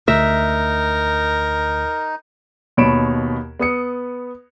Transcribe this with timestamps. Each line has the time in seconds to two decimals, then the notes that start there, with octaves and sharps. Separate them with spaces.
0.08 D2 D#4 A#4 E5
2.77 D#2 B2 C#5 B5 D7 E7
3.60 B3 D#6 C#7